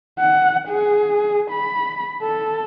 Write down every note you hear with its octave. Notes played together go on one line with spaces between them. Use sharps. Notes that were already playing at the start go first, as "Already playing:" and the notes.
F#5
G#4
B5
A4